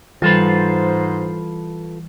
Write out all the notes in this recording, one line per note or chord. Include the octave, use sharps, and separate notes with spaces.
G#2 E3 G3 F4 A4 B4 C5